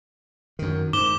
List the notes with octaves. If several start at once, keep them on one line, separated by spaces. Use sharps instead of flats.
F#2 D#3
G#2 D6 E7 G7